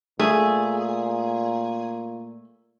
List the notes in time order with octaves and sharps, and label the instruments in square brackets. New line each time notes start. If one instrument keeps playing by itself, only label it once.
[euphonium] A#2 [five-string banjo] A3 [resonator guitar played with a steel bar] G#4